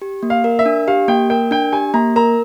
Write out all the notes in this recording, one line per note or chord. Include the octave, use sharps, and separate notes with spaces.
G4
A#3
F5
A#4
E5
D4
G4 F5
A#3 G5
A#4 G5
D4 G5
G4 G#5
A#3 A#5
A#4 A#5